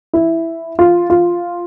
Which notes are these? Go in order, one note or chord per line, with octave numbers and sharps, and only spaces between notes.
E4
F4
F4